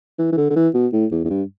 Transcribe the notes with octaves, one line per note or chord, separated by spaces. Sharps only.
E3
E3
D3
D3
E3
B2
A2
E2
E2
G2